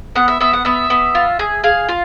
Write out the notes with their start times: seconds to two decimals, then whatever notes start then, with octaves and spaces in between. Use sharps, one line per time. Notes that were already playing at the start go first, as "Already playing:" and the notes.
0.15 B3 F#5
0.28 E5
0.40 B3 E5
0.53 F#5
0.65 B3 E5
0.90 B3
1.15 F4
1.39 G#4
1.64 G#4 F5
1.89 F4